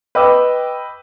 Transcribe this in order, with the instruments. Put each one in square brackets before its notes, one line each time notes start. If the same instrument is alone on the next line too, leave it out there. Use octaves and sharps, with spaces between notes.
[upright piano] B4 D#5 G5 D6 E6